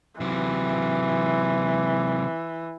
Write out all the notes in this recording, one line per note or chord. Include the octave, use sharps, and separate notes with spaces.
C3 E3 F#3